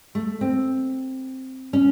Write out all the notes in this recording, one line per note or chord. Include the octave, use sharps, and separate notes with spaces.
A3
C4
C#4